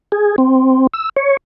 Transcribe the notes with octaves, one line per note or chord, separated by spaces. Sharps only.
G#4
C4
E6
C#5